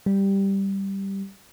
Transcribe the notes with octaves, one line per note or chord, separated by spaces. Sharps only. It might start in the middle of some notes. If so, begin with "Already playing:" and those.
G3